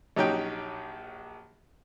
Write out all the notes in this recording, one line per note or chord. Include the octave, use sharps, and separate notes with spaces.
A#1 F#3 C#4 D#4 G4 G5